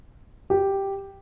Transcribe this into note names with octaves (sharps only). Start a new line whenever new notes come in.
G4